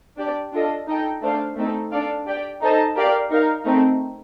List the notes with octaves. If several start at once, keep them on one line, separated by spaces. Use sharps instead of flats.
D4 G4 D5
D4 F4 A4 D#5
D#4 A4 D#5 G5
A3 D4 A4 C5 F5
A3 C4 D#4 A4
D4 A4 D5 F5
G4 D5 G5
D#4 A4 C5 D#5 A5
G4 A#4 D5 F5
D#4 A#4 F5
A3 C4 D#4